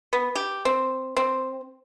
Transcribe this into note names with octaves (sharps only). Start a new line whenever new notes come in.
B3
G4
C4
C4